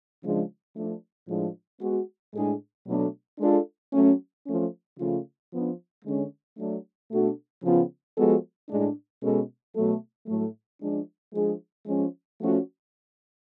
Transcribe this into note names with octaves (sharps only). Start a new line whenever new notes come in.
C#3 F3 G#3 D4
F3 A3 D4
A2 F3 G#3 D4
G#3 B3 F#4
A2 G#3 D4 G#4
B2 F#3 A3 D4
G#3 D4 F4 A4
F#3 A3 C#4
F3 A3 C#4
C#3 F3 A3 F4
F3 B3 D4
D3 G#3 C#4
F#3 A3 D4
B2 A3 D4 F#4 A4
C#3 F3 B3 F4
F3 G#3 B3 F#4 A4
A2 G#3 D4
B2 G#3 C#4 F#4 A4
B2 F#3 A3
A2 F#3 A3
F3 G#3 D4
F3 G#3 D4 G#4
F3 G#3 C#4
F3 A3 C#4 F#4